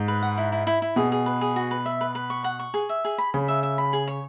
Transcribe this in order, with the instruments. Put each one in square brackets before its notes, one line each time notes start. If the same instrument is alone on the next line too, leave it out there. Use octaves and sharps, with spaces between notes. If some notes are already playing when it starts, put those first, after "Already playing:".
Already playing: [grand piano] G#2
[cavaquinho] B4
F#5
E4
E4
E4
E4
[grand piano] B2 [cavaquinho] G#4
[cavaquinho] G#4
B4
G#4
F#4
B4
E5
B4
B4
C#6
F#5
C#6
G#4
E5
G#4
B5
[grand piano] C#3 [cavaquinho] B5
[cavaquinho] E5
E5
B5
G#4
C#5